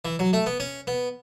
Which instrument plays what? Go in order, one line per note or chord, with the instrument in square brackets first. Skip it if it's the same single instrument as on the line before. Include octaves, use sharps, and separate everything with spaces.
[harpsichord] E3
F#3
A3
B3
C#4
B3